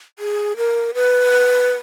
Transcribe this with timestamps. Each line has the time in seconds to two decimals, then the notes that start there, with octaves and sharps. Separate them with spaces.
0.19 G#4
0.57 A#4
0.94 B4